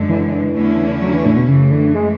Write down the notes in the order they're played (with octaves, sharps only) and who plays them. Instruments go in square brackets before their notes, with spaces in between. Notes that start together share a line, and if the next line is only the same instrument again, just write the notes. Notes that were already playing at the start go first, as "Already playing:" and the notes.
Already playing: [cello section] F#2 D3 G#3
[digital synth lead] E3
[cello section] E2 D3 A3 C#4 E4
[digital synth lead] F#3
E3
A2
B2
[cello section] F#2 E3 A3 [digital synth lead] C#3
[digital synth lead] D3
G#3